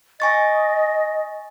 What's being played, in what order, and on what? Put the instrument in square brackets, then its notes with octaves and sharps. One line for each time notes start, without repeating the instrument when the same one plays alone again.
[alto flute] D#5 [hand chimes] G#5 C#6 A6